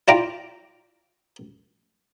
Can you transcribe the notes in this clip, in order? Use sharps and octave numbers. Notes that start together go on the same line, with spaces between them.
E4 F4 D5 G5 A#5 D6